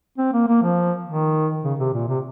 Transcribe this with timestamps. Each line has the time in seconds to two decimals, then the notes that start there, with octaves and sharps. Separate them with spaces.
0.18 C4
0.33 A#3
0.47 A#3
0.62 F3
1.06 D#3
1.64 C#3
1.79 C3
1.94 A#2
2.08 C3